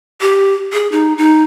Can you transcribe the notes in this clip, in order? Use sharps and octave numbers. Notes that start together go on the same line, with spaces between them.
G4
G#4
D#4
D#4